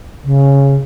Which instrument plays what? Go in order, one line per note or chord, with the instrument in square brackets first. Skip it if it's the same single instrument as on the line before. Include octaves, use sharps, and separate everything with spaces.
[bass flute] C#3